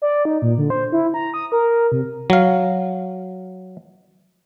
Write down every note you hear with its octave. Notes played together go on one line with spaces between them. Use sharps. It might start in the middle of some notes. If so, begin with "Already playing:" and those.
D5
D#4
A#2
D3
C5
E4
A#5
D#6
A#4
C3
F#3 F5